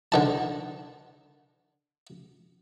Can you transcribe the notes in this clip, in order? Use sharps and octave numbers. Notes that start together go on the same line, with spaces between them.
D3 D#3 A5